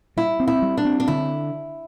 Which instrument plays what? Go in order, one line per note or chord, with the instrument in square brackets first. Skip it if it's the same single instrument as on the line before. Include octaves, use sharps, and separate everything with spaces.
[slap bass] G3 [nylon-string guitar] E4
[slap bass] C4
[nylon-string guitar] E4
[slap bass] G3
[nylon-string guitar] D4
[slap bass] C4
[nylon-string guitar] D4
[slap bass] D3 [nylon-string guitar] E4